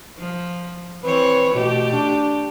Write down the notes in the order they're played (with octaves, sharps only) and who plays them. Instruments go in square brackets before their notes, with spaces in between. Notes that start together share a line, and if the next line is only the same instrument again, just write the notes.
[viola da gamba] F3
[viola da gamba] E3 C4 C#5 [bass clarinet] B4
[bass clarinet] B2 [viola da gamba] A3 G4
[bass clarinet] D4